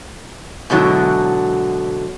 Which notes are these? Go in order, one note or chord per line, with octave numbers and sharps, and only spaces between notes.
G#2 B2 D3 F#3 E4